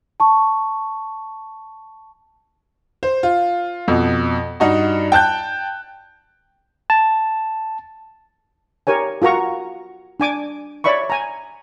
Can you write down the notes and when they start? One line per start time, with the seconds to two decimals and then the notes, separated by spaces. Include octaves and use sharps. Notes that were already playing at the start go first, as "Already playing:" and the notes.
0.20 A5 C#6
3.03 C5
3.23 F4
3.88 F2 B2
4.60 G2 D#4 F#4
5.12 G5 A5 F#6 G6
6.90 A5
8.87 G4 A#4 C#5 G#5
9.22 F4 F#4 A#4 A#5 C#6
10.20 D4 G#5 D6
10.84 C#5 D5 E5 B5 C#6
11.10 G#5 A#5